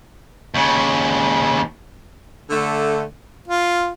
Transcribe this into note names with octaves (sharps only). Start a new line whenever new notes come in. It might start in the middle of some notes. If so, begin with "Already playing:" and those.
D#2 C#3
D3 A3
F4